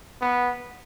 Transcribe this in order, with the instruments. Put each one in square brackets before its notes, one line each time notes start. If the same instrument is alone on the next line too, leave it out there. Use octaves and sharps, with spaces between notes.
[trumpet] B3